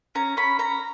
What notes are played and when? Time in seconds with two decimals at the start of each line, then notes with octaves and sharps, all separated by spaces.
0.15 C#4 A#5
0.37 C#4 B5
0.59 C#4 A#5